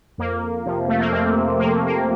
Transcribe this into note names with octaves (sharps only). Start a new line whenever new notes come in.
F2 A#3
C3 F3
A3
A#3
F2 C4
C3 F3 A#3
A3
A#3